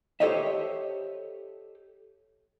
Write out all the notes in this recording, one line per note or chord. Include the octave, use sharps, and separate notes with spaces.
G4 A4 C5 C#5 D#5 E5